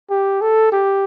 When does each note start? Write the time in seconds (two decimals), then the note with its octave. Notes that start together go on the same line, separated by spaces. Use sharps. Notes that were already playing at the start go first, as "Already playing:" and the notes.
0.10 G4
0.42 A4
0.72 G4